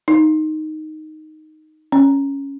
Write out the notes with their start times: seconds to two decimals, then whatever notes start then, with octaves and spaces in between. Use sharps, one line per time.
0.08 D#4
1.92 C#4